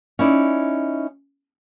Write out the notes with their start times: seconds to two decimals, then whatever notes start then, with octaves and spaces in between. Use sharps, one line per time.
0.19 C#4 D#4 E4 D5